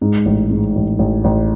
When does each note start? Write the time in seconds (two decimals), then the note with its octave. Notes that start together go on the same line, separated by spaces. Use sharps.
0.01 G#2
0.26 A1
0.51 G#2
0.75 A1
0.99 A1
1.24 A1